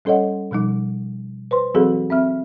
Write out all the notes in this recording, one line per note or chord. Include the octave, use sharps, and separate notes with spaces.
G3 C#4 A4 C#5 D#5 F#5
B2 F3 G3 D#4
B4 C5 C6
E3 F#3 C4 F#4 G#4 A4
C4 E5 F6